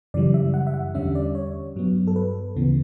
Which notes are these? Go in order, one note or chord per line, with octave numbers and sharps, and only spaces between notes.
F#2 C#3 E3 G3 D5
E5
F#5
E5
F#5
E2 D3 G3 C#4 E5
D5
C#5
G2 F#3 B3
A4
B4
D2 C#3 E3 B3